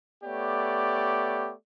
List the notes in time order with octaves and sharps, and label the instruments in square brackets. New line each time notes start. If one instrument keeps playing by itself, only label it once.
[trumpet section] A3 B3 G4 C#5 D5